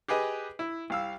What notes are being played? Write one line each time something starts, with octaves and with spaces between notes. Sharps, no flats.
G4 G#4 B4 D#5
E4
C2 F5 E6